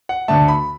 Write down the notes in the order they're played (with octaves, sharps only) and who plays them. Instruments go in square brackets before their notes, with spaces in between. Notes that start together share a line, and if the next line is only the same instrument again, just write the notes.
[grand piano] F#5
D2 D3 A3 A5
B5